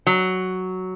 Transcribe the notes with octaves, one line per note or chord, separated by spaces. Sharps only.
F#3